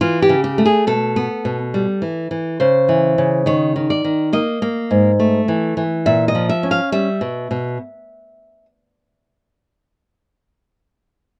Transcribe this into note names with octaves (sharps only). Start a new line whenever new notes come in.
E3 F4
G4
C#3
G4
A3
G#4
B2 A4
B3
B2
G3
E3
E3
C#3 C5
E3
C#3
D#3 C#5
D#3
D5
D#3
A#3 D#5
A#3
G#2
A3
E3
E3
A#2 E5
D#5
F3
E5
C#4
F5
G3 E5
B2
B2